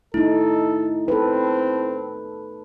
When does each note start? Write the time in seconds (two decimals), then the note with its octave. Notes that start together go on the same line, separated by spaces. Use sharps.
0.14 A3 D#4 E4 A4
1.08 C4 A4 B4